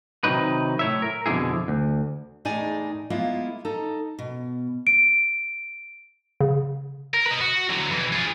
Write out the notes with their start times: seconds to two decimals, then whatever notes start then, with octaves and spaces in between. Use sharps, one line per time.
0.24 C3 D#3 E3 F#3 D#4 B4
0.79 A2 C#5 E5
1.02 A#4
1.26 F2 B2 D3 A3 E4 G#4
1.68 D2
2.45 E2 A2 G#3 D#4 D5 G#5
3.10 G#3 A#3 B3 E4 F4
3.65 D#4 A4 A#5
4.19 B2
4.87 D7
6.41 C#3
7.14 A#4
7.26 B4 D#5
7.41 F#4
7.70 D3 F#3
7.91 B2 E3
8.13 F4 G#4